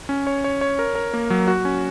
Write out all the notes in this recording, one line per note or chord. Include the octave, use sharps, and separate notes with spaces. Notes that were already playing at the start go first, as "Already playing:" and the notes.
C#4
C#5
C#5
C#5
A#4
A#4
A#3
F#3
F#4
C#4